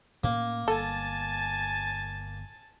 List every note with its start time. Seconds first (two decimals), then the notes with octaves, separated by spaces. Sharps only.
0.24 A2 A#3 C#4
0.68 G1 A4 G#5 A5 A6